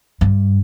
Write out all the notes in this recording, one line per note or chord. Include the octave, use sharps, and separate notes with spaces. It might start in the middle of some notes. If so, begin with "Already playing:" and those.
G2